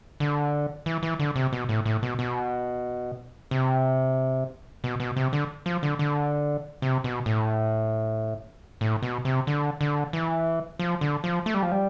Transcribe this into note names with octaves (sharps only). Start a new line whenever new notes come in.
D3
E3
E3
D3
C3
B2
A2
A2
B2
B2
C3
B2
B2
C3
D3
F3
D3
D3
C3
B2
A2
A2
B2
C3
D3
D3
E3
F3
D3
F3
A3
G3
F3
G3